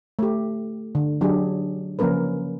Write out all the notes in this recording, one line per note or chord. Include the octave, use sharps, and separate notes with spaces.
A3 G4
D3
F#3 D4 G4 G#4
C#3 F3 A#3 C#4 A#4 B4